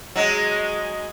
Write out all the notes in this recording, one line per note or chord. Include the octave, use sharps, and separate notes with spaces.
F#3 G#3